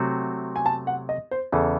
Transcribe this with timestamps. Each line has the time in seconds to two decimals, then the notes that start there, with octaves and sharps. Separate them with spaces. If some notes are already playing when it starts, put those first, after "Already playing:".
Already playing: C3 F#3 A3 C4 F#4
0.56 G#5
0.66 A5
0.87 F#5
1.09 D#5
1.31 C5
1.52 E2 C#3 E3 A4